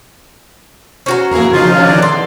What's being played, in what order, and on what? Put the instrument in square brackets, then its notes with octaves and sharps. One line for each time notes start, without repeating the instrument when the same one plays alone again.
[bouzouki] C#4 F#4 A#5 [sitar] C5
[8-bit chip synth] F2 A#3 [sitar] E4 G#4 A#4
[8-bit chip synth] C#3 F3 D#4 [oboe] F4
[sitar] D3 F#3 C#4 [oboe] F5
[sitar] D#3 F#3 A3 [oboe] D5
[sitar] E2 F#3 D5 [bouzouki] D3 [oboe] C6